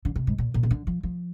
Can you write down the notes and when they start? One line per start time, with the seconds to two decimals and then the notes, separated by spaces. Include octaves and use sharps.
0.05 D3
0.16 C3
0.27 G#2
0.38 A#2
0.54 A#2
0.63 C3
0.71 D3
0.87 F3
1.03 F3